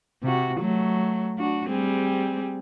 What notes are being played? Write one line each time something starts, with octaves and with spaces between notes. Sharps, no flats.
C3 F#4
F#3 A3
D4 F#4
G3 C4 G#4